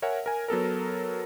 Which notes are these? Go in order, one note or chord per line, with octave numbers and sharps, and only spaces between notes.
A#4 C#5 E5 F#5 G#5
A#4 G#5
F#3 B3 A4 A#4